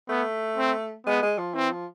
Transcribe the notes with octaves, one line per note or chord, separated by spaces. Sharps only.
A3 B3
C4
G#3 B3
G#3
F3
E3 C4
F3